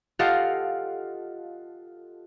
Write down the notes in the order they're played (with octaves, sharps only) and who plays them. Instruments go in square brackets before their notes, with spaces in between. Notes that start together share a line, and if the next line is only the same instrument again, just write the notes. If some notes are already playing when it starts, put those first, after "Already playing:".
[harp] F4 G4 A4 D#5 F5 F#5